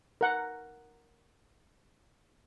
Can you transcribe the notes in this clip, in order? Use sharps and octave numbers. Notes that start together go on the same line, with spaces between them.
A#4 F#5